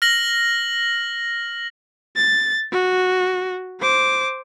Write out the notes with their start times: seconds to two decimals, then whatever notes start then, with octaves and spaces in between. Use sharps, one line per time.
0.02 F6 A#6 F#7
2.16 A6
2.72 F#4
3.80 C5 D6